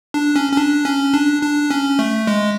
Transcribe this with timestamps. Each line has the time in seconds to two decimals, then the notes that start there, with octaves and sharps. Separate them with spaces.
0.14 D4
0.36 C#4
0.52 C#4
0.57 D4
0.85 C#4
1.14 D4
1.42 D4
1.70 C#4
1.99 A3
2.27 G#3